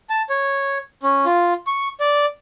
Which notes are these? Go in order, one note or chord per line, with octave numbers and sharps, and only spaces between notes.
A5
C#5
C#4
F4
C#6
D5